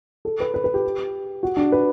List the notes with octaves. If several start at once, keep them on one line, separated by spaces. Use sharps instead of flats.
A4
B4
B4
B4
G4
F#4
D4
B4